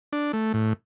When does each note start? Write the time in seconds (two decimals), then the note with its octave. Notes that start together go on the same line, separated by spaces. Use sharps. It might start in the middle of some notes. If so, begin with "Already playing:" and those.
0.13 D4
0.33 A3
0.54 A2